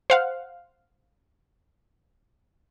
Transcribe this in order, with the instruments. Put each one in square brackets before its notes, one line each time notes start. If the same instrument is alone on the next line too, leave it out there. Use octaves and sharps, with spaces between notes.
[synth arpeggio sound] C5 F5 F#5